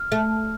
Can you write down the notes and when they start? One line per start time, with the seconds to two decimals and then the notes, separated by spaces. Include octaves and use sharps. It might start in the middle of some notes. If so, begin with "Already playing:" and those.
Already playing: F6
0.12 A3